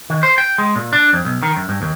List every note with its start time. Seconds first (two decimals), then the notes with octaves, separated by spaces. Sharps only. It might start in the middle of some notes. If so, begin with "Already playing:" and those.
0.10 D#3
0.23 C5
0.38 G5
0.58 G#3
0.76 A#2
0.93 D4
1.13 F2
1.25 B1
1.42 D#3
1.56 F#2
1.69 G2
1.82 D#2